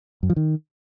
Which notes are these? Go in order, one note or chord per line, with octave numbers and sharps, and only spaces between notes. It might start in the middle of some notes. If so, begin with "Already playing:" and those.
F#2
F3
D#3